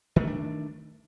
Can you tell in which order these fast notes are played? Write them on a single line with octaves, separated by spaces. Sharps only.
D#3 A3 C#4 D4